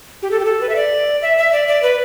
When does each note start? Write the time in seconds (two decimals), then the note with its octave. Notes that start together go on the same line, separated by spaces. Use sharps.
0.22 G4
0.31 A4
0.40 G4
0.45 A4
0.61 B4
0.69 E5
0.76 D5
1.22 E5
1.37 E5
1.53 D5
1.68 D5
1.83 B4